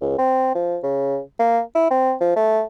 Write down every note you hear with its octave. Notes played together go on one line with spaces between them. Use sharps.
C#2
C4
F3
C#3
A#3
E4
C4
F3
A3